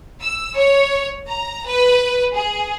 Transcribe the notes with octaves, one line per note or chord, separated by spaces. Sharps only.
E6
C#5
A#5
B4
G#4